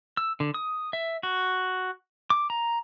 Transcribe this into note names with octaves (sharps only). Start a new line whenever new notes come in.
E6
D3
D#6
E5
F#4
D6
A#5